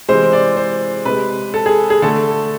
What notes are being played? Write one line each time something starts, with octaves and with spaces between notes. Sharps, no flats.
C3 E3 G#3 C5
D5
C5
C3 G#3 B4
A4
G#4
G#4
D3 A3 A4